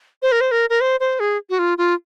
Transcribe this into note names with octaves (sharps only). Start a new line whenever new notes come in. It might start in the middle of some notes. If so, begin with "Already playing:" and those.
C5
A#4
C5
A#4
A#4
C5
C5
G#4
F#4
F4
F4